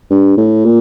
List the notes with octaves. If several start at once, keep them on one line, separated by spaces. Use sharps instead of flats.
G2
A2
A#2